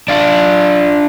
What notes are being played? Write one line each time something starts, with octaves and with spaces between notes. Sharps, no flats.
D4 F4